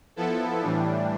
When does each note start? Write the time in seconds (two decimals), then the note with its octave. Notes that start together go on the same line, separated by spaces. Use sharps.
0.16 F3 B3 E4 A4
0.61 A2 E3 G3 D4